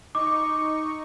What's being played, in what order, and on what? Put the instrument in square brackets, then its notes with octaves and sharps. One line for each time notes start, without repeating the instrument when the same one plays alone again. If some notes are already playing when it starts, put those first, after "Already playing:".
[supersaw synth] D#4 C#6 [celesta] D6